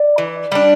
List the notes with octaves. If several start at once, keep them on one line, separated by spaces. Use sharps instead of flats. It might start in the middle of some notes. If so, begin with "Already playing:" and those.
Already playing: D5
E3
G3 D4